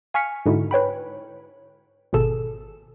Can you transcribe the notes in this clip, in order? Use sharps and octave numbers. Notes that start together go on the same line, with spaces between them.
F5 G#5 C#6 F6 B6 C#7
G#2 D3 D#4 E4 F#4
B4 C#5 G5 B5
G#1 B2 G#4 A4 E7